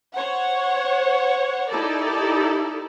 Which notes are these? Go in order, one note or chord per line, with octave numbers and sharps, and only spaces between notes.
C5 C#5 F#5
D#4 E4 G4 A4 A#4 D5